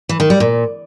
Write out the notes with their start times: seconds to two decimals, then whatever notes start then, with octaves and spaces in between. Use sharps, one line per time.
0.09 E3
0.20 D#3
0.30 G3
0.40 A#2